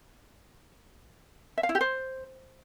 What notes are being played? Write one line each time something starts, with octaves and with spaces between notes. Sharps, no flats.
E5
F5
E4
G4
C5